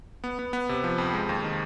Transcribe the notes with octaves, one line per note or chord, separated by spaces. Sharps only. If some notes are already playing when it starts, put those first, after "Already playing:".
B3
B3
B3
C3
F3
F2
G#3
D#2
D#3